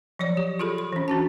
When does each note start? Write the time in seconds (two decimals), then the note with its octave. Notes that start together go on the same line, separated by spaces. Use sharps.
0.19 F3 F#3 C#5 D5
0.37 G4
0.59 F4 G#4 A4 B5
0.78 B5
0.92 E3 C#4
1.08 D4 F#4 A5